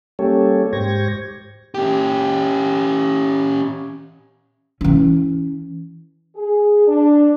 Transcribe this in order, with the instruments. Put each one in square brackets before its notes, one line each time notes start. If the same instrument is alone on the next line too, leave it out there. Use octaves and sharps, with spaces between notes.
[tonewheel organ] G3 A#3 C#4 G4 A4 C#5
G#2 G4 C5 C#6 G#6 A#6
[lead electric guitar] C#4 G4
[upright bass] E3 C#4
[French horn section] G#4
D4